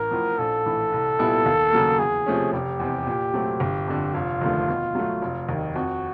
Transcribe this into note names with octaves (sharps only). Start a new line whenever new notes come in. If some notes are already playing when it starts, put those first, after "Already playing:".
Already playing: A1 A#4
A2 F3
A#1 A4
A2 E3
C2
A#2 G3 B3 E4
D#2
C#3 F#3 A#3
E2 G#4
C3 F3 A3 C#4
F1 G4
E2 C3
A#2
F#3 A3 C4
G1
F2 D3
F1 F4
D#2 D3 F3 A3
B2
F#3 A3
F1
D#2 D#3
F2 F#4